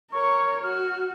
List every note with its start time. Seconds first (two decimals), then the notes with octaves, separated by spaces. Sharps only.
0.12 A#4 C#5 C#6
0.64 F#4 F6